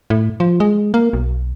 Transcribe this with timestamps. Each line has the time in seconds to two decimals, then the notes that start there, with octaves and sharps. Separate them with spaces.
0.10 A2
0.40 F3
0.60 G#3
0.94 A#3
1.13 B1